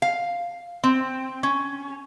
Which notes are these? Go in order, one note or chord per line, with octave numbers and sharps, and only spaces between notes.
F5
C4
C#4